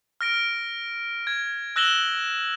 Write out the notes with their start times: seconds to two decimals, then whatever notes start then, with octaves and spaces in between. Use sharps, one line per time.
0.21 F6 A#6 D7
1.27 G#6
1.76 E6 F#6 A#6 E7 F#7 G7